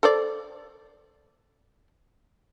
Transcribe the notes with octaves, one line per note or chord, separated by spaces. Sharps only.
A4 C5 D5